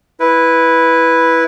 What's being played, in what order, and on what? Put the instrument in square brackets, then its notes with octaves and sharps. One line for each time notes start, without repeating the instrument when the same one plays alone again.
[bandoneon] E4 B4